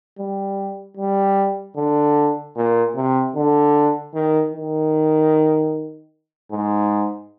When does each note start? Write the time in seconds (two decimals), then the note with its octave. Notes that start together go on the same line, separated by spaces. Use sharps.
0.19 G3
0.97 G3
1.77 D3
2.56 A#2
2.95 C3
3.35 D3
4.14 D#3
4.53 D#3
6.51 G#2